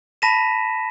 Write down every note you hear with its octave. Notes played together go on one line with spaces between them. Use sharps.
A5 B5 A#6 B6 D#7 E7